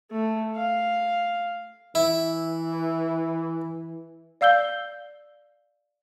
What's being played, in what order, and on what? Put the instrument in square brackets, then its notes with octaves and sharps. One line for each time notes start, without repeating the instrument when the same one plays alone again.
[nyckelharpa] A3
F5
[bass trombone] E3 [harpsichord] E4
[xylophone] D5 F5 E6 G6 G7